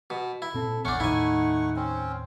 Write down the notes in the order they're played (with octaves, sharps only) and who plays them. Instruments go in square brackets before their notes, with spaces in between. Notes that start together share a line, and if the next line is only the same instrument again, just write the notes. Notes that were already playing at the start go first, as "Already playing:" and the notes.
[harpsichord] B2
E4
[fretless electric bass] A#2 C4 [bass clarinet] A4
[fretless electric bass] A1 D#2 [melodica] A3 F#5 C#6 [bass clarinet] B3 [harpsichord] C#4 D4
[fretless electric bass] D#2 A2 D#3 [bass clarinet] D#4 [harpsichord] E4 G#5
[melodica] C4 C#4